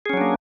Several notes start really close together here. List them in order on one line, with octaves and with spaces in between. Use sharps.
G#4 C#4 F#3 D4 A#3